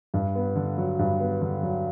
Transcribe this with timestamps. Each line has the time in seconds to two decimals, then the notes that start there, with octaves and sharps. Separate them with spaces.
0.14 G2
0.35 B3
0.56 D3
0.78 F#3
0.99 G2
1.20 B3
1.41 D3
1.63 F#3